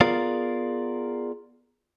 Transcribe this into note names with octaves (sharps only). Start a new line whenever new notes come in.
B3 F4 G#4 A#4 D5 F5